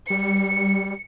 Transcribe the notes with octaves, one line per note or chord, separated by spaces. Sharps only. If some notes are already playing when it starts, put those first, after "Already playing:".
G3 C#7